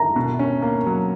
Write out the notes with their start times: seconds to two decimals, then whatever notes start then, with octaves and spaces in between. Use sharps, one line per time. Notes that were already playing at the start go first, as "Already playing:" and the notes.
Already playing: A#5
0.16 B2
0.39 C#4
0.62 A#3
0.86 F#3